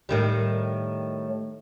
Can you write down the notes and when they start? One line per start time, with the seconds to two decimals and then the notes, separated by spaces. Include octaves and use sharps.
0.09 A2 D#3 G3